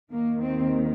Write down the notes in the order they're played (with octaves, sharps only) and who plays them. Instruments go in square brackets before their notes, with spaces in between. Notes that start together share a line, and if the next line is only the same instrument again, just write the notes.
[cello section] D#2 D#3 A#3
C4